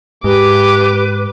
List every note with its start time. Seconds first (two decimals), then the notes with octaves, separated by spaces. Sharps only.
0.24 G#2 G4 B4 D6